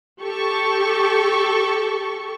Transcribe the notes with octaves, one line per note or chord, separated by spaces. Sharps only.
G4 A4 C#6